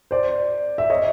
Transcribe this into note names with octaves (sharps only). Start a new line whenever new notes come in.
C5 D5
E5
C#5 D#5